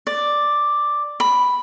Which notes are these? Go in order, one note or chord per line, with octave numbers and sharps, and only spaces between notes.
D5
B5